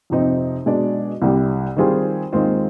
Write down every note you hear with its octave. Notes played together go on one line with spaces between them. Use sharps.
F2 C3 F3 C4 D#4
B2 G#3 D4 G#4 D5
C2 C3 G3
D#3 G3 C4 F4 G#4
D#2 D#3 G#3 C4 F4